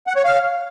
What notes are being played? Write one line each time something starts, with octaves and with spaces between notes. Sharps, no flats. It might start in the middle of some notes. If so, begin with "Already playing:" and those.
F#5
C#5
F5